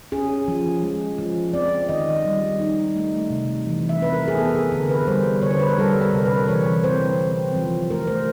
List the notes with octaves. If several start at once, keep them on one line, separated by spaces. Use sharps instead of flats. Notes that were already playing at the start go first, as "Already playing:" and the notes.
C#4 G#4
F3
G#3
F3
C4 D5
D#3 D#5
G3
D#4
A3
C3
E3
E5
C4 B4
A#4
G#4
B3 A4
G#4
D3 A#4
B4
G3 C5
D3 C#5
C5
B4
A#4
G3 A4
A#4
C3
B4
E3 C#5
C4 C5
C4
F3
A3 A#4
C5